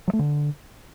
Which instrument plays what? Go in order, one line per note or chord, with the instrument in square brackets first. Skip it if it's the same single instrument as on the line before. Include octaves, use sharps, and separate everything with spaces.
[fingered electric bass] F#3
A3
D3